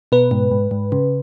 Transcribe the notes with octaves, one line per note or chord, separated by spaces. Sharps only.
B2 B4
G#2
G#2
G#2
C#3